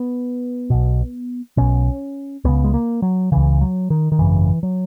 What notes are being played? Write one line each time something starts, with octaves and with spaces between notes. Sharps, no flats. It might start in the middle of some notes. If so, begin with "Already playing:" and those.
Already playing: B3
B1 B2
B1 B2 C#4
C#2 C#3 B3
G#3
A#3
F#3
C#2 C#3 E3
F#3
D#3
D#3
G#1 F#2 C#3 E3
F#3